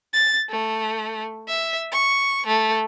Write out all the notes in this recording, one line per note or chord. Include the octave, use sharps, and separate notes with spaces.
A6
A3
E5
C#6
A3